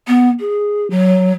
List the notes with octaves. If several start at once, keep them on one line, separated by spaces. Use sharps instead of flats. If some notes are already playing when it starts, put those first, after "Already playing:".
B3
G#4
F#3